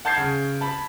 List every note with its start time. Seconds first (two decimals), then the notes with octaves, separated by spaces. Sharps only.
0.05 F#5 A5 G6 G#6 C7
0.17 C#3
0.61 A5 B5